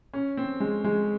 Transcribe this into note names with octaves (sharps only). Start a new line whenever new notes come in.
C#4
C4
G#3
G#3